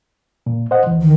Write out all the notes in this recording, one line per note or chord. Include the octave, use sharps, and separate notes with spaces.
A#2
C5 D#5 F#5
D2 E3
D#3